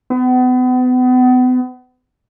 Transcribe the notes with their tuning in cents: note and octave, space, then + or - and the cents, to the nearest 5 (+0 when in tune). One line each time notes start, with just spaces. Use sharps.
B3 +35